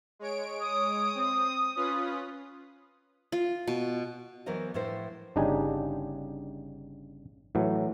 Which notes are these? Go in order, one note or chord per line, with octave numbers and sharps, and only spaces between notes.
G#3 C#5 D7
D#6
C4
C#4 F4 B4
F4
B2
E3 F#3 B3 A#4 C5 D#5
A2 F3 E4 B4 C5
G1 C#3 D4 D#4 G4 G#5
A2 E3 F#3